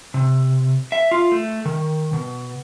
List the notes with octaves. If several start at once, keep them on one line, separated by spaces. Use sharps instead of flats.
C3
E5
F4
A3
D#3
B2